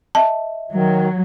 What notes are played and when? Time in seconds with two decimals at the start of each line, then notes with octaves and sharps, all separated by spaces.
0.15 D#5 E5 A5
0.73 D#3 F#3